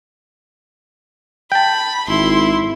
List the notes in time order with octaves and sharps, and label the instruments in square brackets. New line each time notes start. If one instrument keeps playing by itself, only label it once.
[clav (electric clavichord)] G5 A5 [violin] B5
[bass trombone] G#1 [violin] E4 C6